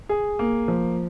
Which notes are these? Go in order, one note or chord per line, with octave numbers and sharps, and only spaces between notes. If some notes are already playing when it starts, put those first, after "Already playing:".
G#4
A#3
F3